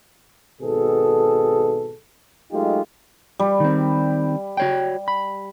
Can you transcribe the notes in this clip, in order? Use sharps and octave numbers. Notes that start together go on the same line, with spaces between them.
G#1 B2 G#4 A4
F#3 G#3 A3 D#4 F4 G4
G3
D#3 C4
F#4 C#5 G5
B5